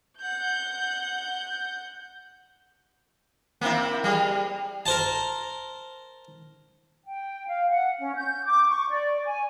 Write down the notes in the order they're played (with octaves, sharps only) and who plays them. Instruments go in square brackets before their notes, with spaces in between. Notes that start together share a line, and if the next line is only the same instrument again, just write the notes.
[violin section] F#5 G6
[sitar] A#3 C4 E4
G3 G#4
[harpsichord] A#4 C5 A5
[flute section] G5
F5
F#5
C#4
G6
D6
C#6
D5
G#5